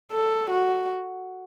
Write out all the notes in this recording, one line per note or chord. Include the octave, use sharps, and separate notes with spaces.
A4
F#4